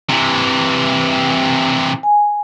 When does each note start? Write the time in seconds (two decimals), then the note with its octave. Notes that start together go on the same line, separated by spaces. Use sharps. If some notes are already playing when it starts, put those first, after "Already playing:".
0.10 C3 E3
2.03 G#5